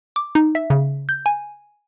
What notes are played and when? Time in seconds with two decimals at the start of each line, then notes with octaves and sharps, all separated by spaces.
0.16 D6
0.35 D#4
0.55 E5
0.70 C#3
1.09 G6
1.26 G#5